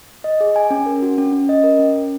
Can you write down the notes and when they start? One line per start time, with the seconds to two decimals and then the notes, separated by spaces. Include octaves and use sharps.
0.24 D#5
0.40 G#4
0.56 G#5
0.70 C#4
0.86 A#4
1.03 F#4
1.18 C#4
1.33 C#4
1.49 D#5
1.63 A#4
1.79 C#4
1.96 C#4